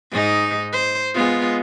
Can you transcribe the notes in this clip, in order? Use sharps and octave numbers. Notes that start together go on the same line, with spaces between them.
G#2 D#4
C5
G#3 B3 F4